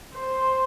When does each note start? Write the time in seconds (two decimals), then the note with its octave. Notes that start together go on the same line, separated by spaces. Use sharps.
0.15 C5